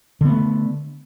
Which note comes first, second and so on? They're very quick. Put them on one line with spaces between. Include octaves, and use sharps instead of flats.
D3 B3 A3